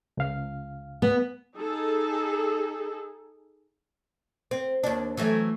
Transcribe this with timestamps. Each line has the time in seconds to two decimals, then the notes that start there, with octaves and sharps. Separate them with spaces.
0.17 C#2 F5
1.02 B3
1.56 D#4 G#4 A4
4.51 C4
4.83 D#2 D4
5.17 E3 F#3 A3